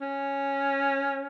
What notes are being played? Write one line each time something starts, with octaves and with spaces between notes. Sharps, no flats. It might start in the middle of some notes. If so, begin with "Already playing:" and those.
C#4